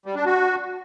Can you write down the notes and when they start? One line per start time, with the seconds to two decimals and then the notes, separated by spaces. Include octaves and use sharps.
0.06 G3
0.15 D4
0.25 F#4